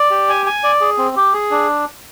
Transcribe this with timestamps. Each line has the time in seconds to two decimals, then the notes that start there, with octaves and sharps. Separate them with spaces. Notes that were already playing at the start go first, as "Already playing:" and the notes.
Already playing: D5
0.11 G4
0.29 G#5
0.46 G#5
0.64 D5
0.81 G#4
0.98 C4
1.17 G4
1.33 G#4
1.51 D4